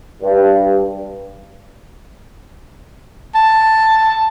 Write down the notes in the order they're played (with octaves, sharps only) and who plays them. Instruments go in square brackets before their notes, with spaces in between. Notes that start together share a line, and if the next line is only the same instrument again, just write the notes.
[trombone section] G2
[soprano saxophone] A5